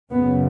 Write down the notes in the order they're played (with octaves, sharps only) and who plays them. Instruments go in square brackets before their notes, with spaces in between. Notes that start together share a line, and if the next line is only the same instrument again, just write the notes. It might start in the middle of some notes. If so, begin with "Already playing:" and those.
[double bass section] F#2 C#3 B3